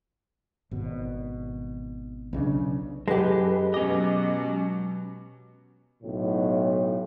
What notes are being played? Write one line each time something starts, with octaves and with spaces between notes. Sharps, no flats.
G#1 B2
B1 C#3 E3 D4
F#2 G#3 G4 A4 B4
B2 F#3 C#4 D#5 D6
B1 A2